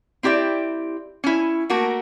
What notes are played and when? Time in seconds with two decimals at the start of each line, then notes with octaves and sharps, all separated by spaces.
0.23 C4 E4 G4 D5 E5
1.24 C#4 E4
1.70 A3 A#3 F#4 A#4